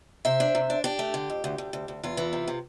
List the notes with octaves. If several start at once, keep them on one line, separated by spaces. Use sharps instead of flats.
C3 C5 E5
D4
C3
D4
D4 G4
A3
D3
F2
D2
D2
D2
D2
E2 F4
E3
C3
C3